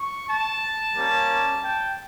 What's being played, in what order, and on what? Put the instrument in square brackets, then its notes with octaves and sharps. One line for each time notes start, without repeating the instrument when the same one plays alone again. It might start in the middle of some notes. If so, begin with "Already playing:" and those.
Already playing: [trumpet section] C#6
A5
G3 A#3 C#4
G5